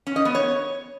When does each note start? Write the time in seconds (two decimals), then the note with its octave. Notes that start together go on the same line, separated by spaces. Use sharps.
0.07 C#4
0.16 D#5
0.25 B3
0.35 C#5